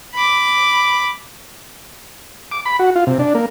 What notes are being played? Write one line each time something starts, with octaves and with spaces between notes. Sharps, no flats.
B5 D6
D6
B5
F#4
F4
C3
D4
A#3